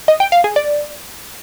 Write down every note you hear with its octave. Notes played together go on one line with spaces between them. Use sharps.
D#5
G5
F5
G#4
D5